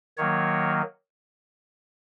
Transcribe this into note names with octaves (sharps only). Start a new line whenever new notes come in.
D#3 F#3 A#3 C#5